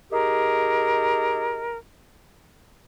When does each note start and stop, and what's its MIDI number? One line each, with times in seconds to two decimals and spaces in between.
0.11 1.77 63
0.11 1.77 67
0.11 1.77 68
0.11 1.77 70